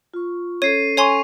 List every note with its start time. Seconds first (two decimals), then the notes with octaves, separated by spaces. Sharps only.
0.14 F4 C#6
0.62 C#4 A4 C#5 C7 D#7
0.97 C#5 G#5 C6 C#6 F7